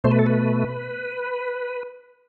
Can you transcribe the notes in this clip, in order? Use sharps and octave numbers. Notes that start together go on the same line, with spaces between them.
B2 A3 C5
B4
A4
B4